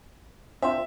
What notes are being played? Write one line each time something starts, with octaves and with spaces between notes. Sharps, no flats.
C4 D4 F4 E5